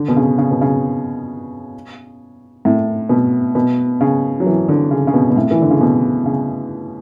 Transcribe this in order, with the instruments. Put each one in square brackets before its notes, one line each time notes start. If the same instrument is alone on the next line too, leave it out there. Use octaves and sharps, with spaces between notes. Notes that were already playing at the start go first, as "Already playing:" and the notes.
Already playing: [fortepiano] D3
B2
C#3
C#3
B2
C#3
A2
B2
B2
C#3
F#3
E3
D3
C#3
C#3
B2
B2
A2
E3
D3
C#3
B2
C#3